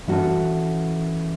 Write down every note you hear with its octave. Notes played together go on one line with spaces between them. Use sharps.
E3 C#4 F#4 A4